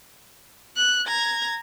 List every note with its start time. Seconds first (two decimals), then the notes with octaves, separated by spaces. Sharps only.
0.76 F#6
1.08 A#5 G#6